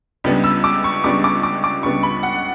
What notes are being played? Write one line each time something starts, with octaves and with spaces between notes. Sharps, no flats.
C#2 C#3 G3 B3 D4
E6
D6
C#6
C#2 C#3 G3 B3 D4 D6
D6
D6
D6
C#2 C#3 G3 B3 D4 C#6
B5
F#5